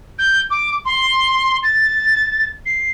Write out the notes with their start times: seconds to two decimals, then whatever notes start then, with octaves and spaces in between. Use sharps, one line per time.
0.18 G6
0.50 D6
0.85 C6
1.63 A6
2.65 C7